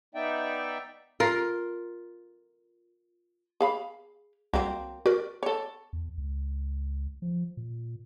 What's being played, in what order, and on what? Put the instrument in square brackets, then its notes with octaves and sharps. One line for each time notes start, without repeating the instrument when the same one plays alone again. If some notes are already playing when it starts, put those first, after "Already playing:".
[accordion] B3 D#4 D5 E5 G5
[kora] F4 A#4
[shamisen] G#4 F5 B5
[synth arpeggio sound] C2 [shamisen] F#3 A#3 C4
[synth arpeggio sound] F#4 A#4 [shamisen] D5
[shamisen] A4 C#5
[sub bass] E2
C#2
F3
A#2